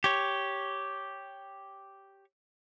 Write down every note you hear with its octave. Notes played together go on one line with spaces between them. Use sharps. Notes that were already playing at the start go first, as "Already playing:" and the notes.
G4 C#5